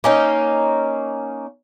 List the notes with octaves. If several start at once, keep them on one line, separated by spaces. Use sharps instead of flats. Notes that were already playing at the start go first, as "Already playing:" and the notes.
A#3 C#4 D#4